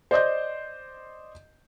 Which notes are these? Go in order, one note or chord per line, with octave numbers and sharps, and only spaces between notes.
C5 D5 D#5 G6